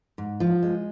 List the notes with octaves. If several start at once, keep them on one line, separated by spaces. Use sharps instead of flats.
G#2
F3
G#3